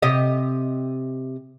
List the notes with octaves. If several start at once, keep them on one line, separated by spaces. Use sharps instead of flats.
C3 G4 D#5